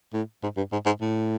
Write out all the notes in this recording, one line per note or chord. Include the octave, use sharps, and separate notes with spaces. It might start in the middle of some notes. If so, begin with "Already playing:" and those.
A2
G#2
G2
G#2
G#2
A2